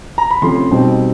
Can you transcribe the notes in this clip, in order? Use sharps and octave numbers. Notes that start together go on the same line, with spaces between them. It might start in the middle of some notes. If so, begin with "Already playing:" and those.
A#5
B5
C3 F3 A3 C#4 C6
B2 G3 C4 D#4